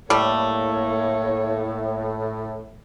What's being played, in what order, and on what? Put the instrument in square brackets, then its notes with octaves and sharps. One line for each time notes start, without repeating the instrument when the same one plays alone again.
[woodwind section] A2 [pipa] G3 A3 [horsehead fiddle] A#3 C#5